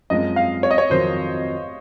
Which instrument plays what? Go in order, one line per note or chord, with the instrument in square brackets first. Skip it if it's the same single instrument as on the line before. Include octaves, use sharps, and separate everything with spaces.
[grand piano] F#2 F3 G#3 C4 [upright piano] D#5
[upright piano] F5
C#5
D#5
C#5
[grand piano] F2 D#3 F#3 C4 [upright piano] C5